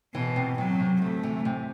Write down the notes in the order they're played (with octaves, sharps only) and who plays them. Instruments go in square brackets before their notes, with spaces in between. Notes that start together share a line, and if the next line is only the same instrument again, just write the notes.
[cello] B2 [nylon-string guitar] E3
[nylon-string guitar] C3
[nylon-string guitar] C3 [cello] F#3
[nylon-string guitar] C3
[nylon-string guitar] D2 [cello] A3
[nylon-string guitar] E3
C3